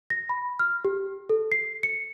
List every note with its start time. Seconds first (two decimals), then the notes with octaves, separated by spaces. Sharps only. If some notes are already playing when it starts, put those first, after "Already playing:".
0.10 A#6
0.29 B5
0.59 F6
0.85 G4
1.29 A4
1.52 C7
1.83 C#7